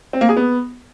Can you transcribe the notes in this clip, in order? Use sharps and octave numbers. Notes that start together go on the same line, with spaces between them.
C4
A#3
G#4
B3